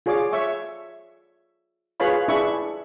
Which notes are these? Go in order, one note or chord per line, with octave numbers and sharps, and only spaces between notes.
F4 G#4 C#5 D5 D6
C#5 E5 C#6
F4 G#4 B4 C#5 F5 B5
D4 E4 G#4 E5 B5 C#6